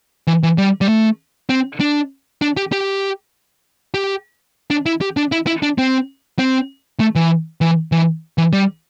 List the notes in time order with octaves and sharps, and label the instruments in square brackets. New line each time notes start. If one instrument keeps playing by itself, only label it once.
[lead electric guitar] E3
E3
G3
G3
A3
C4
D4
D4
G4
G4
G4
D4
E4
G4
D4
E4
E4
D4
C4
C4
A3
E3
E3
E3
E3
G3